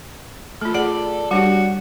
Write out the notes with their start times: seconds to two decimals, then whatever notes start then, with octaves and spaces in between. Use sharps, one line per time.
0.61 A3 F4 A4
0.74 G#4 D5 F#5
1.31 G3 D4 F#4 G4